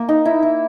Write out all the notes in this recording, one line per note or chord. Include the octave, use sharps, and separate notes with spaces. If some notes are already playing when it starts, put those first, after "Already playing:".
Already playing: A#3
D#4
E4
E4